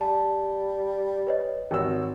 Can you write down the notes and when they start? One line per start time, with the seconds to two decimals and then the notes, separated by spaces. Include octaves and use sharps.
0.01 G3 A5
1.27 B4 C#5 D#5
1.71 G#1 F#4 C#5 G5 E6